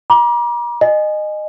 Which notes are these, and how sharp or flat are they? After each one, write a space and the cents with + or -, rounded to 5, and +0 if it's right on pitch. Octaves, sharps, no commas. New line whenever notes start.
A#5 +40 D6 +0
D#5 -20 G#5 +0